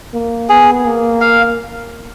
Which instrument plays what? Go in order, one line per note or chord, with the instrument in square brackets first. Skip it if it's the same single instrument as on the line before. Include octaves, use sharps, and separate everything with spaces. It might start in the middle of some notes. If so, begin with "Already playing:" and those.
[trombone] A#3
[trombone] B3 [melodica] G#4
[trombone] A#3
[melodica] F5